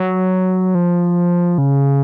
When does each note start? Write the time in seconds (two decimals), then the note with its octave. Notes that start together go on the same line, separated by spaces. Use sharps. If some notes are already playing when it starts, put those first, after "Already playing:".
Already playing: F#3
0.75 F3
1.58 C#3